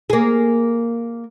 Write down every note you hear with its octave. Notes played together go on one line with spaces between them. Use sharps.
A#3 G#4